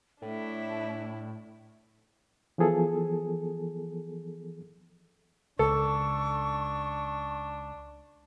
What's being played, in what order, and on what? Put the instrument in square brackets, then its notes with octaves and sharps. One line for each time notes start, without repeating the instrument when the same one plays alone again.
[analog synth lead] A2 [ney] A3 [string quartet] D4 E4
[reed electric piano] E3 F3 B3 G#4 A4
[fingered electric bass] C#2 [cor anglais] D4 [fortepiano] A4 [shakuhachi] C#6